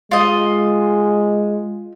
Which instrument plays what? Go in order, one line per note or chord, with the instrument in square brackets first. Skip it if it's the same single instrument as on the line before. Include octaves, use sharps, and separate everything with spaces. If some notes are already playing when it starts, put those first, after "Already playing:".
[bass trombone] G#3 [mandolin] F4 D#5